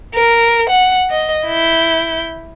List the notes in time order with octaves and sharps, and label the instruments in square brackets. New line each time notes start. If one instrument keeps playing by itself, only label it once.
[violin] A#4
F#5
D#5
E4 G6